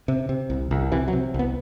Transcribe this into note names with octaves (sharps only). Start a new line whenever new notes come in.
C3
C3
C2
C2
C3 E3
F#3
C3
C2
B3